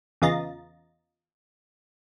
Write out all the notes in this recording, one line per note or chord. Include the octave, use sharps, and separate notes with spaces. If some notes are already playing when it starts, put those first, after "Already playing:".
E2 C#3 F4 D#5 A#5 A6